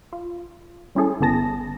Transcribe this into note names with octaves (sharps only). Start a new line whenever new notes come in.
F4
G3 C#4 E4 G#4 A4
G1 D3 B3 G#4 A5 A#6